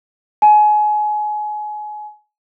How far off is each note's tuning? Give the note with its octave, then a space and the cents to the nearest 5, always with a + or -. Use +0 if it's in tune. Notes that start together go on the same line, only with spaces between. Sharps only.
G#5 +30